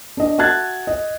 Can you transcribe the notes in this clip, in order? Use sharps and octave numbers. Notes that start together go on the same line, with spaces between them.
D4 D#5
F#4 E5 A5 F#6 G#6 A6
D#5